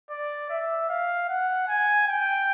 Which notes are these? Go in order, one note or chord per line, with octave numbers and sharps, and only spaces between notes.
D5
E5
F5
F#5
G#5
G5